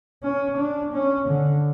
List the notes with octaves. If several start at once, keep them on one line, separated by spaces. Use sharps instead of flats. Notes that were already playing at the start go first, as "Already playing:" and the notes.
C#4
D4
C#4
D3